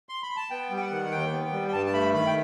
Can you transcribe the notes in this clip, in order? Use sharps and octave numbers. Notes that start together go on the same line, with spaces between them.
C6
B5
A5
B3 G5
G3
G5
F#5
D#3
D#2 G5
B3
G3
G5
G2 A5
A5
A3 B5
D#3 B5
G5